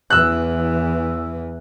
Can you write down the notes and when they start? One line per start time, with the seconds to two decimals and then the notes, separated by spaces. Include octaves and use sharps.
0.10 E2 E3 E6 F#6